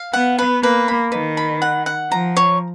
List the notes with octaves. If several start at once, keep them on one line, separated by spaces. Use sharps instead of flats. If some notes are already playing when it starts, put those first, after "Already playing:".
Already playing: F5
B3 F#5
B4
A#3 B4
B5
D#3 B4
B5
F#5
F#5
F3 A#5
C#5